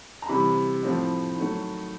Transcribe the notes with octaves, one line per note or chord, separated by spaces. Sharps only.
A#5
C3 E3 G3 B5
A2 F3 A3 C4
D#3 F#3 A3